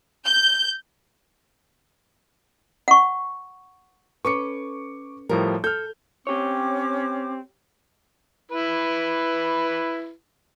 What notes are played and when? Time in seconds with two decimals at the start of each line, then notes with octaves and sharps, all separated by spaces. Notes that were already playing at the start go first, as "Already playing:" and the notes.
0.24 G6
2.88 F#5 C#6
4.25 C#4 A4 B4 C#6 D6 C#7
5.29 A2 F3 G3 A#4
5.64 A4 F6 G6
6.27 C4 C#4 G4 C#5 D6
8.51 E4 B4